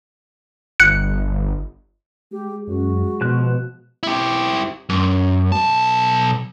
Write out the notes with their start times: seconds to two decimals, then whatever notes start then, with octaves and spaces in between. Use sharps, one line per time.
0.80 G1 F#6 C#7
2.32 G#3 G4
2.68 F#2 F#4
3.21 B2 F3 F#6
4.03 E4 G4
4.90 F#2
5.52 B1 A5